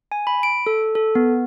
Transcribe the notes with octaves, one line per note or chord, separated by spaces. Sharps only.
G#5
B5
D7
A4
A4
B3